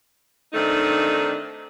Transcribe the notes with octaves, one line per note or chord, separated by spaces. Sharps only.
D#3 A3 C4 D4 D#4